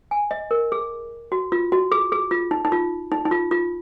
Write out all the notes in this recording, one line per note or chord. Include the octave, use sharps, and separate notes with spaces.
G#5
D#5
A#4
G#4
F#4
F4
F#4
G#4
G#4
F4
D#4
D#4
F4
D#4
D#4
F4
F4